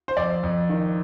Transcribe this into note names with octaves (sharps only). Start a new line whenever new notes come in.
C5
F2 D5
F2
D#3